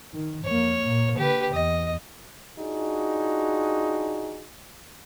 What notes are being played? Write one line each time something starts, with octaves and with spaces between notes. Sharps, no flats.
D#3
F2 A#3 C#5
A#2 A#3
D3 G4 B4
E2 D#5
D4 D#4 F4 F#4 G#4